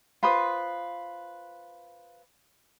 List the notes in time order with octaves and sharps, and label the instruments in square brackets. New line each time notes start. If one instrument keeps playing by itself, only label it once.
[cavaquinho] F4 B4 C5 D#6